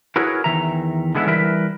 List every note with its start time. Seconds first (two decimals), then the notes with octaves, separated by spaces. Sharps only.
0.16 E4 F#4 G#4 A#4 B4 C#5
0.44 E2 G2 D#3 E3 E5 A#5
1.15 D3 G#3 B3 E4
1.27 E3 G3 A#4 B4 E5